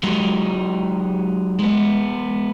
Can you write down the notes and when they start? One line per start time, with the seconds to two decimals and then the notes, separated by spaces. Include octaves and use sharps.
0.03 F#3 G#3 D#4 F#4 G4
1.59 G#3 B3